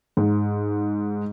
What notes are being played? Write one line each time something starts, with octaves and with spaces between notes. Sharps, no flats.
G#2